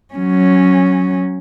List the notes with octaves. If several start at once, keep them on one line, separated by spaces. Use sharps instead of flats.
F#3 C#4